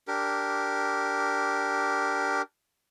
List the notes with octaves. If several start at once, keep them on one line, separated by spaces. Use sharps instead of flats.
D4 G4 A#4